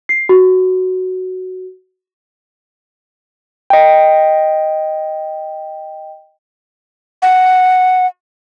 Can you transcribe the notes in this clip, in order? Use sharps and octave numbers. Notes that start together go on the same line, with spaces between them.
C7
F#4
D#5 G5
F#5